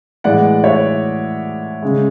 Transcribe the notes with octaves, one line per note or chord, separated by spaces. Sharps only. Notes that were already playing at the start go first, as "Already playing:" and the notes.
A2 E3 G#3 D5 F#5
C#5 E5
C#3 G#3